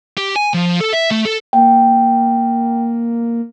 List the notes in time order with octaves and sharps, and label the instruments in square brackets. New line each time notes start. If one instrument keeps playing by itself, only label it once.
[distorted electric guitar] G4
G#5
F3
A4
E5
A3
A4
[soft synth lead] A#3 [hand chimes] G5